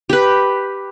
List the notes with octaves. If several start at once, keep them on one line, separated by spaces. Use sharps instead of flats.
G4 B4